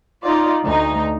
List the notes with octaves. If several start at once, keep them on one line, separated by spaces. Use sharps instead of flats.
D#4 F4 D5
D2 D#4